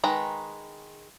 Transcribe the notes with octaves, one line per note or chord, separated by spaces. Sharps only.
D#3 G#3 B4 A#5